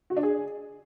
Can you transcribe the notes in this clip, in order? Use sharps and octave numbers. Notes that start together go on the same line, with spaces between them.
F#4
D4
G#4